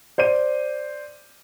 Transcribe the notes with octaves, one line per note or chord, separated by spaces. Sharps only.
C5 D5 G6 D#7